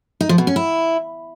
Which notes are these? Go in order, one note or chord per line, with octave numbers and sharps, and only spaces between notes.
D#4
F3
B2
C#4
E4